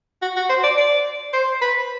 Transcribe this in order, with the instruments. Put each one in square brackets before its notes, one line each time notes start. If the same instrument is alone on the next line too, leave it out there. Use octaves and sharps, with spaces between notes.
[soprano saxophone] F#4
F#4
C5
D5
D5
C5
B4